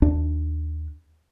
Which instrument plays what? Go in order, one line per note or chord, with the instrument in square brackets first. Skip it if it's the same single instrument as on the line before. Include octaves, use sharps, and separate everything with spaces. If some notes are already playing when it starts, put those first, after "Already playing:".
[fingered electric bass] D#2 D4